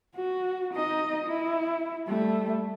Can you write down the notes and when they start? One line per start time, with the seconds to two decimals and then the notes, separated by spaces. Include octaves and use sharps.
0.15 F#4
0.74 D#4 D#5
1.27 E4
2.07 G3 A3